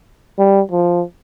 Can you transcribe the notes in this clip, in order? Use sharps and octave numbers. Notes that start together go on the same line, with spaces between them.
G3
F3